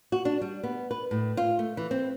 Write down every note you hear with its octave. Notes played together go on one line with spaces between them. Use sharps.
F#4
D4
G3
B3
B4
A2
F4
A3
E3
C4